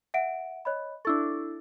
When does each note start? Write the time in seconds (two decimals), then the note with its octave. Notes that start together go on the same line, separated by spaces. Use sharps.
0.14 E5 F#5 D7
0.65 C#5 D#5 B5
1.05 D4 E4 A4 C#6